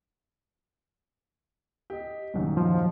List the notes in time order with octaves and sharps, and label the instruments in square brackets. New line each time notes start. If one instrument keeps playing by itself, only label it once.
[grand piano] G4 D#5
D#1 F#2 D#3
[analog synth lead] F3